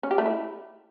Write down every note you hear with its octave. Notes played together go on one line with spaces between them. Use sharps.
C#4
G4
A3
E4